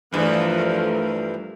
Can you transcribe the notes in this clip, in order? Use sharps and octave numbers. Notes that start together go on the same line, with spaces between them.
G2 E3 F3 A3 A#4